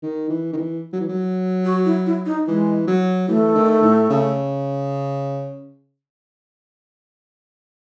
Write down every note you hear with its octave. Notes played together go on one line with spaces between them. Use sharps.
D#3
E3
D#3
E3
F#3
E3
F#3
F#4
E4
E4
D#4
E3 G#3
F#3
E3 A3
D#3
A2
C#3